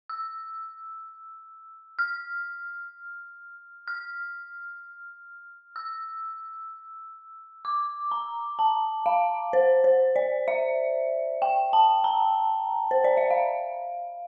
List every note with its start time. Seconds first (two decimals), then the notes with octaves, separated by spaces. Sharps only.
0.09 E6
1.99 F6
3.88 F6
5.76 E6
7.65 D6
8.11 A#5
8.59 A5
9.06 F5
9.53 C5
9.84 C5
10.16 D5
10.48 E5
11.42 G5
11.73 A5
12.04 A#5
12.91 C5
13.04 D5
13.17 E5
13.30 F5